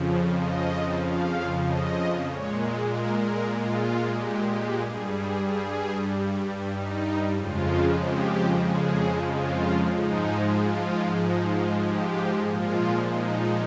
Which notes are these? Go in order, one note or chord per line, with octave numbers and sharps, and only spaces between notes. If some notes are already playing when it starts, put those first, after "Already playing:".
Already playing: F2 C#3 F3
D#5
F5
D#5
A#2 G#3 C#5
A#4
A#4
F4
G4
G4
G2 G3 G#4
G#4
G#4
D#4
F2 C#3 F3 G#3 F4
G4
G#4
F4
G#2 F3 G#3 D#4
F4
D#4
F4
G4
A#2 F3 G#3 F4
D#4